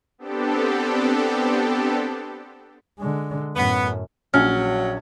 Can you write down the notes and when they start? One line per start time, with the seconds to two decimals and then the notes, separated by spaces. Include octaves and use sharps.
0.18 B3 C4 D4 G4 A4
2.99 D3 G#3
3.56 F#2 A2 B3
4.34 A#1 F#3 C#4 F6